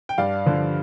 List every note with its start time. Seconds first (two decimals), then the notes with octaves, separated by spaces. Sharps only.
0.09 G5
0.18 G2 D5 F5
0.46 D3 F3